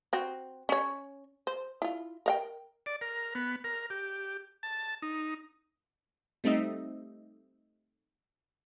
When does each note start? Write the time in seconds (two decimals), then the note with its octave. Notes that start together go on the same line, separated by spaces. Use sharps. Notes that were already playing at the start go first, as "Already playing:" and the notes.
0.13 C4 F#4
0.69 C#4 C#5
1.47 C5
1.82 E4 F4
2.26 A#4 F5 G5
2.86 D5
3.01 A#4
3.35 B3
3.64 A#4
3.90 G4
4.63 A5
5.02 D#4
6.44 G3 A3 C4 D#4 D#5 E5